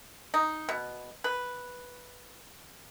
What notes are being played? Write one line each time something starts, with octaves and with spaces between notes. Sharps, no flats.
D#4
B2
B4